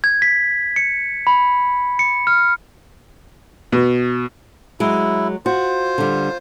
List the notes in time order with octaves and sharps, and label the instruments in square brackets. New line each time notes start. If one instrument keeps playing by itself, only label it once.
[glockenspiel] G#6
B6
C#7
B5
C#7
F6
[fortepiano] B2
[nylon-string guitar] F#3 G#3 [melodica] E4
[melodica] F4 C5 [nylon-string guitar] F#4
[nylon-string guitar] D3 G3